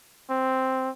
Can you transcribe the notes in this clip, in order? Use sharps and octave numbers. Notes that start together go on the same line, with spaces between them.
C4